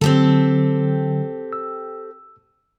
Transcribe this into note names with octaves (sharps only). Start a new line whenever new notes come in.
D3 F#3 C4 G4 A4
E6